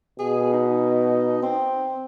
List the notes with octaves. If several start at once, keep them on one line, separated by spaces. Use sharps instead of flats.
B2 G#4
D#4
C4